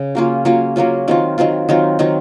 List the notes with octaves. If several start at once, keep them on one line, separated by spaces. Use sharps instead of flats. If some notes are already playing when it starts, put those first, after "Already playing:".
Already playing: C#3
F#3 A#3 C#4 F4
F#3 A#3 C#4 F4
F#3 A#3 C#4 F4
D#3 F#3 C4 F4
D#3 F#3 C4 F4
D#3 F#3 C4 F4
D#3 F#3 C4 F4